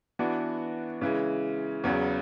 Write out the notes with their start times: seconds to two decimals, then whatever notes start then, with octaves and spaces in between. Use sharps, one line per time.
0.19 E3 B3 D4 F#4
1.01 C#3 E3 G#3
1.84 E2 C#3 F#3 B3